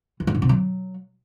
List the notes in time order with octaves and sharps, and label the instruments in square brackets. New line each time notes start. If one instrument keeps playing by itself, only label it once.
[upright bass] E3
F#2
G#2
C3
F#3